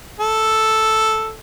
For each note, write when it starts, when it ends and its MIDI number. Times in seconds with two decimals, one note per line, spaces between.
0.20 1.36 69